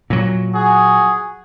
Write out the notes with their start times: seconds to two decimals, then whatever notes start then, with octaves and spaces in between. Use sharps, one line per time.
0.10 A#2 F#3
0.54 F#4 G#4